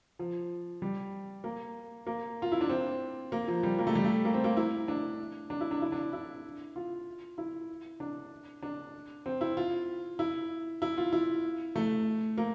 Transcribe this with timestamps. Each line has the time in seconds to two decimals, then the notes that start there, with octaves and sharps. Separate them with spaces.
0.19 F3
0.82 G3
1.44 A#3
2.07 A#3
2.42 F4
2.52 E4
2.61 D4
2.69 C4
3.32 A#3
3.48 F3
3.63 G3
3.79 A#3
3.87 A3
3.95 G3
4.04 A3
4.25 A#3
4.34 C4
4.44 A#3
4.57 E4
4.88 D4
5.50 D4
5.61 E4
5.71 D4
5.82 E4
5.92 D4
6.13 E4
6.76 F4
7.38 E4
8.00 D4
8.63 D4
9.26 C4
9.41 E4
9.57 F4
10.19 E4
10.82 E4
10.98 F4
11.13 E4
11.76 A3
12.38 A#3